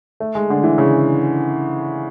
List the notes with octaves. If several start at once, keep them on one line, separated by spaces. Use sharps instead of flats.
A3
G#3
D3
E3
C#3